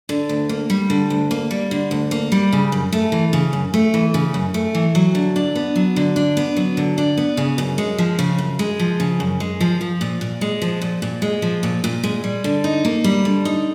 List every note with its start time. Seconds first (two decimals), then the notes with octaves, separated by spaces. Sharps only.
0.09 D3
0.29 D2
0.49 A#3
0.70 G3
0.90 D3
1.10 D2
1.31 A#3
1.51 G3
1.71 D3
1.91 D2
2.11 A#3
2.32 G3
2.53 C#3
2.72 F#2
2.92 A3
3.12 E3
3.33 C#3
3.53 F#2
3.74 A3
3.94 E3
4.14 C#3
4.34 F#2
4.54 A3
4.75 E3
4.95 F#3
5.15 D3
5.36 D4
5.55 B3
5.76 F#3
5.96 D3
6.16 D4
6.37 B3
6.57 F#3
6.77 D3
6.98 D4
7.17 B3
7.37 C#3
7.58 F#2
7.78 G#3
7.98 F3
8.19 C#3
8.38 F#2
8.59 G#3
8.79 F3
9.00 C#3
9.20 F#2
9.40 G#3
9.60 F3
9.81 F3
10.01 A#2
10.21 A#2
10.41 G#3
10.62 F3
10.82 A#2
11.02 A#2
11.22 G#3
11.42 F3
11.63 A#2
11.84 A#2
12.03 G#3
12.24 G3
12.44 D3
12.64 D#4
12.85 A#3
13.04 G3
13.25 D3
13.45 D#4